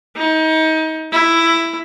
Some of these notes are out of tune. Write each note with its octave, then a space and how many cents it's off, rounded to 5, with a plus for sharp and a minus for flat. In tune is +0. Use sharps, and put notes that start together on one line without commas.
D#4 +30
E4 +10